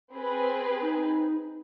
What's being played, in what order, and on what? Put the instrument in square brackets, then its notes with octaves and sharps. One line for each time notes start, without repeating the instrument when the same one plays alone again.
[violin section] C4 G#4 B4
[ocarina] D#4